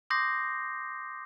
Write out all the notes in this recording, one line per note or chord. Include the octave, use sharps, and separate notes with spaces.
C6 D6 D#6 G6 A#6 C7